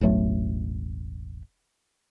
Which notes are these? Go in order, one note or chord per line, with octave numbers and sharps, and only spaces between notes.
E1 A1 F#3 A3